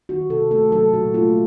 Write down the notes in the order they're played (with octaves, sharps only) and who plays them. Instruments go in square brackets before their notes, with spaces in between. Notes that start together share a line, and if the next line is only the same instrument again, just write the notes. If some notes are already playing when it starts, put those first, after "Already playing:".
[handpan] D#3 F#4
C3 A4
A3 A4
F#3 A4
A#2 F#4
A3 F4